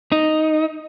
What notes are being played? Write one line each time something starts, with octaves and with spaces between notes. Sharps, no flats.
D#4